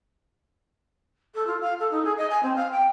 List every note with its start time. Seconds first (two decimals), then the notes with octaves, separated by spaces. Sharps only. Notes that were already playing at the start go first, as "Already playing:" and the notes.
1.35 A4
1.47 F4
1.61 F5
1.80 A4
1.91 D#4
2.05 G#4
2.17 D#5
2.30 G#5
2.43 C4
2.56 F5
2.71 G5